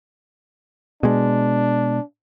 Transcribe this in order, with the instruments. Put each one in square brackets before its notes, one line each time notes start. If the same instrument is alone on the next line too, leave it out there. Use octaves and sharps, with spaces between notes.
[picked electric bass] B2 G#3 [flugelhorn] D4